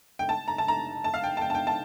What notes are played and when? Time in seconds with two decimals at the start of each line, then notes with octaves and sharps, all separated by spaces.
0.19 G5
0.29 A5
0.48 A#5
0.58 A5
0.68 A#5
1.04 A5
1.14 F5
1.24 G5
1.37 A5
1.41 G5
1.50 A5
1.55 G5
1.67 A5